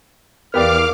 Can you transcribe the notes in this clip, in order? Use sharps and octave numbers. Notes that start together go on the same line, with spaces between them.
E2 B3 G4 A#4 D5 F5 D6 F6